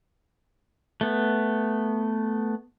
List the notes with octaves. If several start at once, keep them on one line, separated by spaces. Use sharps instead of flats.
A3 B3